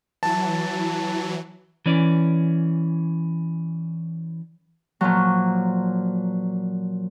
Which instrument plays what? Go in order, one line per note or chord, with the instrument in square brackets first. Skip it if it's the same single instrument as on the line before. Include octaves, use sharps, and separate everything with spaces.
[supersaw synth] E3 F#3 [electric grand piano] A5
[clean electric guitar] E3 C#4 D5
[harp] A#2 F3 F#3